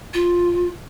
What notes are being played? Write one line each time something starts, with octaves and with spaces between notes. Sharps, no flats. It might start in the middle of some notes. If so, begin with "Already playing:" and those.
F4